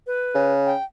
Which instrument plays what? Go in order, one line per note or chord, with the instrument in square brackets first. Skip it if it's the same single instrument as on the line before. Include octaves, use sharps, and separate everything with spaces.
[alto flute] B4
[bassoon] C#3
[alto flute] G5